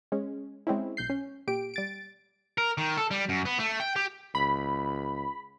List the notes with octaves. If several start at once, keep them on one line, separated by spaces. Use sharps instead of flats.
G#3 C#4
G#3 C4 C#4 E4
B1 G6 C7
C#4
A#2 G4 D7
G3 A6 D7
A#4
D#3
A4
G3
F#2
B3
A3
G5
G4
C#2 B5